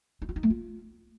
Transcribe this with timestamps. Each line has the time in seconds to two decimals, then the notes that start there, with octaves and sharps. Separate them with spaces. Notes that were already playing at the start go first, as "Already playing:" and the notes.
0.22 D#4
0.29 F4
0.36 D#4
0.43 A3
0.50 F4